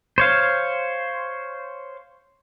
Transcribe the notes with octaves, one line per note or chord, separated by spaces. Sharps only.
C5 C#5 F5